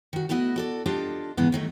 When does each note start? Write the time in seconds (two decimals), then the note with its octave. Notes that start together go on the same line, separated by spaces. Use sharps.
0.13 D#3 F#4
0.29 A3 B3 E4 F#4 D#5
0.56 F#4 A4 D5
0.86 D4 F4 G4 A4 D#5 A5
1.37 G#2 C#3 E3 G#3 B3
1.52 D#3 F#3 A3